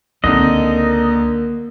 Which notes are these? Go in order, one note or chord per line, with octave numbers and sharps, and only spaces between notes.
C#2 D3 F#3 A#3 C4 D#4 D#5